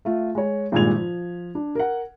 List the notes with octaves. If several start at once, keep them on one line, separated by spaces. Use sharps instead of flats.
A3 F4
G#3 C#5
G#1 G2 A#2 G#3 G#6 F7
F3
D4
A#4 F#5